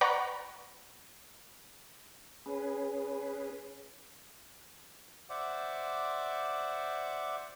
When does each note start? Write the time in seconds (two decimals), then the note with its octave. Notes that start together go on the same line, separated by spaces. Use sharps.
0.01 B4 D5 F#5 A#5 B5 C#6
2.46 C#4 G#4 B4
5.30 C5 D5 E5 F#5 D6